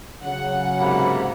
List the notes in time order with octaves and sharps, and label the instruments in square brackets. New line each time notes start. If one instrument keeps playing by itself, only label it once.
[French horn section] C#3 F#3 [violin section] F#5
[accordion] G#2 C3 A#3 [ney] B5